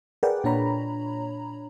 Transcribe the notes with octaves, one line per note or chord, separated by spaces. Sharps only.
G#4 A#4 B4 D5 F#5 G5
A#2 D4 C#5 A#5 B5